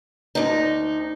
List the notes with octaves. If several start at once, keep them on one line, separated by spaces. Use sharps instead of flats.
D2 D#4